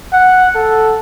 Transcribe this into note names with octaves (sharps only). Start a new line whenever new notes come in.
F#5
A4